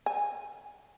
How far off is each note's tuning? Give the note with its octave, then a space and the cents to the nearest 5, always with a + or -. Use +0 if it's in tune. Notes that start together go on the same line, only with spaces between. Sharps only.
G#5 -15